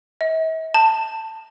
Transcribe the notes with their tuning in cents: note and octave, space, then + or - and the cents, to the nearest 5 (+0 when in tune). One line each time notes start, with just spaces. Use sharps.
E5 -45
A5 +15